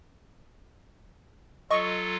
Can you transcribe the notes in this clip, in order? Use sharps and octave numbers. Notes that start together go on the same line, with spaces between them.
F#3 F4 A4 D#5 C#6